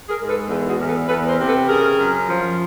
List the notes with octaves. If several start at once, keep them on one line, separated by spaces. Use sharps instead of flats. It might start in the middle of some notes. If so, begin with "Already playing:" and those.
G#4 A#4
G#2
A4 B4
E2 A4 B4
F#4 G#4
E2
A4 B4
E2 A4 B4
A#4 C5
C3
A4 B4
C#3 G#4 A#4
F#2
F3